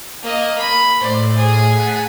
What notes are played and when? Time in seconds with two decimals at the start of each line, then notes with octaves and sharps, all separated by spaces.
0.22 A#3 D#5
0.58 B5
1.00 A2 C5 D5
1.36 G#4
1.72 F#5 A5 B6